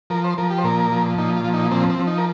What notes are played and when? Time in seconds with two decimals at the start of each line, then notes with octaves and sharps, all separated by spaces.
0.10 F3 A#4
0.24 C5
0.38 F3 A#4
0.50 G4
0.58 C5
0.64 A#2 A#4
0.92 F3
1.18 A#2 D#4
1.36 F4
1.44 F3
1.54 D#4
1.71 F3 C4
1.90 C4
1.99 F3
2.07 D#4
2.18 A#4